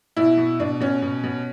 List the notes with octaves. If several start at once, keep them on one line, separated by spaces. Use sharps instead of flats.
B2 E4
B2
B2 D4
B2 C#4
B2
B2